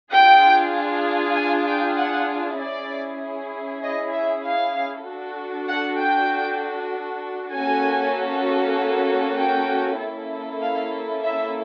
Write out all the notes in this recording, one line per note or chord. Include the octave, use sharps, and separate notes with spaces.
D4 F4 G#4 G5
G#5
G5
F#5
C#4 E4 G#4 D5
D#5
E5
F5
D4 F#4 A4
F#5
G5
A#3 C#4 F#4 A4 G#5
G5
A#3 C#4 E4 A4
F5
E5